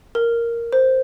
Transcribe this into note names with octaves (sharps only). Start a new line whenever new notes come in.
A#4
C5